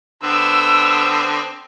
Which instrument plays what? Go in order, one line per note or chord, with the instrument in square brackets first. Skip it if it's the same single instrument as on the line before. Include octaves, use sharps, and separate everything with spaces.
[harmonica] D3 B3 C4 [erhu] E6